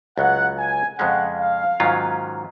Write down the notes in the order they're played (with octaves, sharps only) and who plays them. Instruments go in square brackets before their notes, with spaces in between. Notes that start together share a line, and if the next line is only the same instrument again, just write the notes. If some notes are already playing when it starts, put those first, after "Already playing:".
[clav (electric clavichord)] C#2 C#3 F#3 [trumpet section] F#5
[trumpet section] G#5
[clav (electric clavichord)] F2 C#3 G#3 C#4 [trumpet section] F#5
[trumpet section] F5
[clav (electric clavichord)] G#2 D#3 F#3 C#4 F4